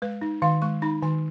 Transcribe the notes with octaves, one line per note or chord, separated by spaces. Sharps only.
G#3 B4
D#4
D#3 F5
G#3 C#6
D#4 B5
D#3 G#5